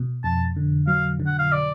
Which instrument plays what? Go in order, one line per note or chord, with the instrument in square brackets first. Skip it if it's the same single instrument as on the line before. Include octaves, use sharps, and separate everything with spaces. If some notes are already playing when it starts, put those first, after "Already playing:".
Already playing: [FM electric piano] B2
[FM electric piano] F2 [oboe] A5
[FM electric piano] D3
[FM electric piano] F#3 [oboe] F5
[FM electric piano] D3
[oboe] F#5
F5
D5